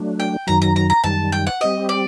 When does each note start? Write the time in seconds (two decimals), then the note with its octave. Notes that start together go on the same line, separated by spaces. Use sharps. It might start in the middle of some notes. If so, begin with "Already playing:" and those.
Already playing: F#3 A3 D4
0.20 G5
0.47 F#2 D#3 F#3 A#5
0.62 A#5
0.76 A#5
0.90 A#5
1.04 F#2 D#3 G3 A5
1.32 G5
1.47 F#5
1.60 G3 C4 G4 D#5
1.89 D5